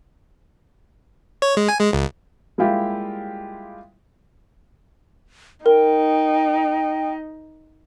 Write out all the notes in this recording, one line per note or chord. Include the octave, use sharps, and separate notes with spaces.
C#5
G#3
G#5
G#3
C#2
G3 G#3 A#3 E4 F4 G4
D#4 A#4 G5